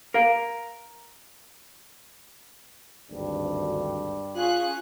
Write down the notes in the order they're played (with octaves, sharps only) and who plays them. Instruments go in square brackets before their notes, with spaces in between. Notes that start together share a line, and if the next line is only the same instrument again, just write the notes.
[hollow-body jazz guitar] A#4 F5
[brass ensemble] G#1 D2 [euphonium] G2
[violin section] C#4 G#4 F#6 [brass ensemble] F4